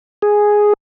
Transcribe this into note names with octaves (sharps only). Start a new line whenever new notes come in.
G#4